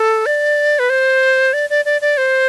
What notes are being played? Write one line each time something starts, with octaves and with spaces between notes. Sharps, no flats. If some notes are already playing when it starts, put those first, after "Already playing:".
Already playing: A4
D5
B4
C5
D5
D5
D5
D5
C5